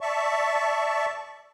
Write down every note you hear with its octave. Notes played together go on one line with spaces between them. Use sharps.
D5 E5 A5 C#6